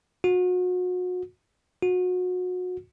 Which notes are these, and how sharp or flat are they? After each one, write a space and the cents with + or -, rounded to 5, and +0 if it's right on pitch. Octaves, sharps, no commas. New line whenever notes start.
F#4 -35
F#4 -30